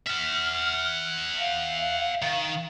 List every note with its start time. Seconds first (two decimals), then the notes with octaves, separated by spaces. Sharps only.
0.07 E5 F#5 F6
1.40 F5
2.22 D#3